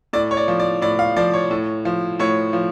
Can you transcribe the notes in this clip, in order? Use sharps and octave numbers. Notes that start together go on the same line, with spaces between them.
A2 D5
C#5
D5
F3
D5
A2 D5
F5
F3 D5
C#5
A2
F3
A2 C#5
F3